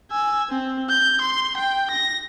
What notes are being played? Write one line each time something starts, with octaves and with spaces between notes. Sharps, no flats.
G#5 E6
C4
G6
C6
G5
A#6